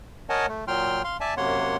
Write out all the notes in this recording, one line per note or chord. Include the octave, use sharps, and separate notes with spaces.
A#4 C#5 D#5 F#5 G#5 A5
A3
A#2 F#3 G5 C6 F6
F5 C6
D5 E5 G#5 A5
F#2 C3 A#3 C#5 F#5 C6